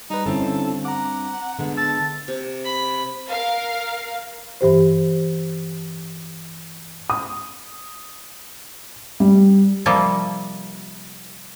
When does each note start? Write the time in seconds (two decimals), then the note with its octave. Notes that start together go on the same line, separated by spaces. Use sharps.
0.10 G3 D#4 B4
0.26 G2 D3 C4 C#4 E4 A4
0.85 F#5 A#5 D6
1.59 D3 G#3 B3
1.77 A5 E6 A6
2.28 C3
2.65 B5
3.30 A#4 F5
4.61 G2 E3 G4 C5
7.10 D#6
9.20 G3
9.86 C3 F3 G3 A#3 A4